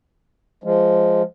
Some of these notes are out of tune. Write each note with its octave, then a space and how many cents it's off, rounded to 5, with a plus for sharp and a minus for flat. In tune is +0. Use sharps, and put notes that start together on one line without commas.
F3 -5 G#3 +0